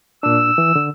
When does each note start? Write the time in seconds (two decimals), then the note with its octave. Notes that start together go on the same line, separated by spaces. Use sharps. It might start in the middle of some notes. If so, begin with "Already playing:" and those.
0.23 A#2 D4 E6
0.58 E3
0.76 D3